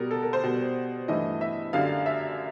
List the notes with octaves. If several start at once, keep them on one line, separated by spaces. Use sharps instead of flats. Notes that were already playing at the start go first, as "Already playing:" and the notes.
Already playing: B2 G3 A#4
A4
A#4
C5
B2 G3
G2 E3 A3 D#5
E5
F#2 D3 G3 F5
E5